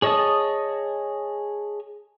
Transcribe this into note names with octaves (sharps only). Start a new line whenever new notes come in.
G#4 C#5 D#5 A5 D#6